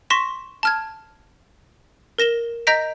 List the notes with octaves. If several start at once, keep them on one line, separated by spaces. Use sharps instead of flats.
C6 C#6 A#6 B6 E7
A5 F6 G#6
A#4 A#6 E7 G7
D#5 A#5 G6 A#6 B6 D7